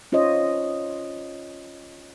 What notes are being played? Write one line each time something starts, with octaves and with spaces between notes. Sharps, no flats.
C#4 F4 C5 C#5 D#5